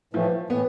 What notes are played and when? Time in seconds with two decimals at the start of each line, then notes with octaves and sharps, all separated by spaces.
0.13 A2 E3 F3 A3
0.50 A2 E3 B3